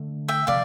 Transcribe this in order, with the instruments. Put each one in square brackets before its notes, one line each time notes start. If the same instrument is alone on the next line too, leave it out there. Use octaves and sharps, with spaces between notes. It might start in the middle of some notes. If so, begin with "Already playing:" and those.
Already playing: [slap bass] D3 A3 D4
[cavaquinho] E5 G5
[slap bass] C3 F3 [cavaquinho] D5 F5